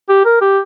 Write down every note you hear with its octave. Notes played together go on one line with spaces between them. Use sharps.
G4
A#4
G4